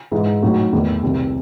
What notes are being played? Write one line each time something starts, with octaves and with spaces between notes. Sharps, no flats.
G#2 E3 G#3
A2 F#3 A3 D#4 F#4
E2 D#3 A3
C2 C3 D#3